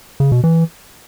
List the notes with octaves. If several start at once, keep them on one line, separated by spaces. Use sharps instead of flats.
C#3
B2
E3